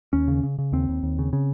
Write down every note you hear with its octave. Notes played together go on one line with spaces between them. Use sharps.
D#2 C#4
C#3
C#3
C#3
D#2 C4
D#2
D#2
C#3
C#3